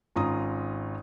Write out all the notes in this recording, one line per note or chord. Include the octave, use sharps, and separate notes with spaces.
G#1 C#4 F4 A#5 D#6